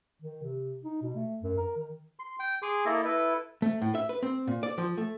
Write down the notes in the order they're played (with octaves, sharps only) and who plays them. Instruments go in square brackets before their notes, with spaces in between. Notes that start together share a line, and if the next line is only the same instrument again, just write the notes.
[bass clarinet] D#3
C3
D#4
B2
A3
F#2
A#4
D#3
[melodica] C6
G5
G#4 G#5 C6 D6
A#3 E4 A4 D#5
E4 A4 B4
[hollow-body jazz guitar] A3
A2
E5
B4
C4
A#2
D5
F3
A3